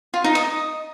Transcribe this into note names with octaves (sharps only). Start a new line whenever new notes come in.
F4
D#4
D#5